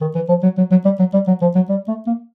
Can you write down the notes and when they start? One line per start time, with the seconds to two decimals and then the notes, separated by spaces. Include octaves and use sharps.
0.02 D#3
0.15 E3
0.29 F3
0.43 F#3
0.58 F#3
0.71 F#3
0.85 G3
0.99 F#3
1.14 G3
1.28 F#3
1.42 F3
1.56 F#3
1.70 G3
1.88 A3
2.07 A#3